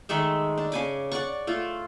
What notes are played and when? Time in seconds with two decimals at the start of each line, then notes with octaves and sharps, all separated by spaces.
0.09 D#3 G#3 A3 E5
0.58 D4
0.72 C#3 G#5 D6
1.12 D5 F#5 C#6
1.47 A3 F4